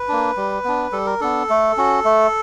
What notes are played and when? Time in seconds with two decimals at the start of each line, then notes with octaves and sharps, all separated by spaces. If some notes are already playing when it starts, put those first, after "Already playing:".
Already playing: B4
0.09 A#3 D4
0.37 G3
0.64 B3 D4
0.92 G3 A4
1.07 A#4
1.20 B3 D4 A4
1.49 A3
1.77 C#4 F#4
2.05 A3